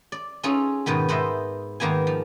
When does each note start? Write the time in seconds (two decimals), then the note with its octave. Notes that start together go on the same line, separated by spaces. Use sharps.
0.12 D5
0.43 C#4 D#4 F4 G#4 A4
0.86 G#2 B2 D#3 B3
1.09 G#2 B3 C5 D#5 E5
1.80 G#2 D#3 A#3 B3 G#5
2.07 F3